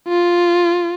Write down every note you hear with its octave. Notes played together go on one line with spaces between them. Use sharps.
F4